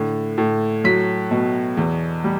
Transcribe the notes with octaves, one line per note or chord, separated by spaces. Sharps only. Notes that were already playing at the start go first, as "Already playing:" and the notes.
Already playing: A2 D3
A2
F#3 B6
B2
E2
G3